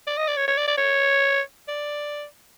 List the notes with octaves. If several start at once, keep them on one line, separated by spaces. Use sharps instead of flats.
D5
D#5
D5
C#5
C#5
D5
D5
C#5
D5